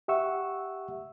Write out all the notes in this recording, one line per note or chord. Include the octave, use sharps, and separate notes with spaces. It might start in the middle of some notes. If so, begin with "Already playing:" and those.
G4 E5 F#5 C#6 E6